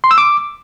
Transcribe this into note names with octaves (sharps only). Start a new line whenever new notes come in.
C6
E6
D6